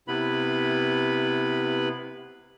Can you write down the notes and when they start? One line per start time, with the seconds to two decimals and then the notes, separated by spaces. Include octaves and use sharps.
0.08 C3 B3 E4 B4 B5